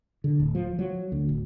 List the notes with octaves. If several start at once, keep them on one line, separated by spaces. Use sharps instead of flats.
D3
D1
F3
F#3
D2
D1